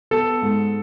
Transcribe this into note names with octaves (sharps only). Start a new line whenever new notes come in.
B3 A4
G#2